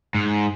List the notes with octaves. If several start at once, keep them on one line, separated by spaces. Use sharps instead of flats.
G#2